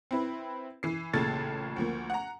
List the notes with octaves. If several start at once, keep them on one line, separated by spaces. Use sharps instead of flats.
C4 E4 B4
E3 C7
A1 A#2 C#3 A4 G#6 A6
D2 F3 A#3
F#5 A#5